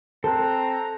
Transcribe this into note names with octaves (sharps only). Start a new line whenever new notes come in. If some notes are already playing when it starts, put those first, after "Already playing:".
C4 A4 A5 A#5 F#6